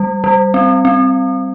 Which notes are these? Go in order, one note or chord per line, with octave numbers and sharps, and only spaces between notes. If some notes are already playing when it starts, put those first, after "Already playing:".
Already playing: G3
G3
C4
C4